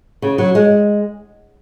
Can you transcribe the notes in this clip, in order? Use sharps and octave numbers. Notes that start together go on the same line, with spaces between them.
C#3
F#3
G#3